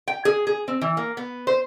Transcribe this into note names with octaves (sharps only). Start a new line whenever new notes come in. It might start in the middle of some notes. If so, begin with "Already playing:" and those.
G5
G#4
G#4
C4
E3
A#3
B3
C5